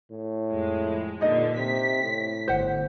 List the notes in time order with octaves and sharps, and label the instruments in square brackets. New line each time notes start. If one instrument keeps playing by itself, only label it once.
[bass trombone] A2
[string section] F2 G#3
[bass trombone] G2 [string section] A#2 D3 [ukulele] D#4 D#5
[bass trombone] C3 [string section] B6
[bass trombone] A2
[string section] G1 [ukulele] C5 F#5